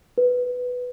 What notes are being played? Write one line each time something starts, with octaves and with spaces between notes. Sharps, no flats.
B4